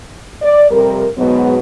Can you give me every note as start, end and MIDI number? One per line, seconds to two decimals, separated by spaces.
0.42 0.69 74
0.71 1.07 41
0.71 1.07 48
0.71 1.07 55
0.71 1.07 70
1.17 1.59 44
1.17 1.59 47
1.17 1.59 54
1.17 1.59 56
1.17 1.59 59